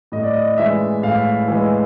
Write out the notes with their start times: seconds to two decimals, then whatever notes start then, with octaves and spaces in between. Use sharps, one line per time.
0.12 A2 D#5
0.23 D5
0.33 D#5
0.58 E3 G#3 E5
1.03 A2 F5
1.48 E3 G#3